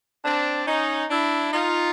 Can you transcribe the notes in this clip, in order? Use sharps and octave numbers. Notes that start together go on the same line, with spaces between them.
C4 D4
C#4 D#4
D4 E4
D#4 F4